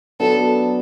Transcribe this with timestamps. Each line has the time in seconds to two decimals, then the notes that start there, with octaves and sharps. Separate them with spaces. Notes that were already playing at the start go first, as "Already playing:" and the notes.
0.20 F#3 B3 D4 A4